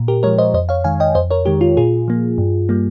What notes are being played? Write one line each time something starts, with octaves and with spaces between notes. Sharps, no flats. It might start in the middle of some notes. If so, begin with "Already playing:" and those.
Already playing: A#2
G4 A#4
F3 G#3 A#4 C#5
C5 D#5
F2 C5 D#5
C#5 F5
D#3 G#3 F5 G#5
D#5 G5
F2 C5 D#5
A#4 C#5
D#3 G#3 G4
F4
A#2 F4 G#4
F3 A#3
G2
G3 A#3